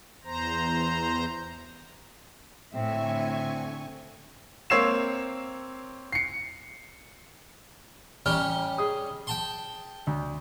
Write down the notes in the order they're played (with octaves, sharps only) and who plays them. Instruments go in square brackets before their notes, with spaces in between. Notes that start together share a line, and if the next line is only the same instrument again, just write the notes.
[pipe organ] E2 C5 A#5
[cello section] A2 [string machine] D3 G#5 C#6 [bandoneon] C4 [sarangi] E5
[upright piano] A#3 C4 C#5 E6 C7 E7
C7 C#7
[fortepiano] A1 F6 [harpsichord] G3 C#4 G4
[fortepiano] G#4 D#6
[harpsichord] G5 A5 C6
[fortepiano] D2